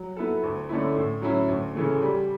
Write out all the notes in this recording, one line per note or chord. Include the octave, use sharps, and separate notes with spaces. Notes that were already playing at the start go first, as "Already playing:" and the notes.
Already playing: F#3
B3 E4 A4
D2
D3 A3 C#4 E4
A2
F#3 C#4 E4
D2
C#3 E3 A3
G3